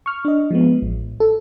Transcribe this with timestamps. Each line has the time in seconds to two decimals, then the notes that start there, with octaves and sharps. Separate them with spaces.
0.06 C#6 F6
0.25 D4 D#5
0.51 F3 G#3 B3
0.82 A1
1.20 A4